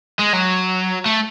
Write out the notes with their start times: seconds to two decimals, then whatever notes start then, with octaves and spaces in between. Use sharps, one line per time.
0.19 G#3
0.33 F#3
1.06 A3